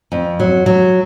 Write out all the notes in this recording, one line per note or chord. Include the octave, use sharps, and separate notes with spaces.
F2
F#3
F#3